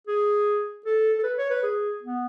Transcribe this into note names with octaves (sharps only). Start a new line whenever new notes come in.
G#4
A4
A4
B4
C#5
B4
G#4
B3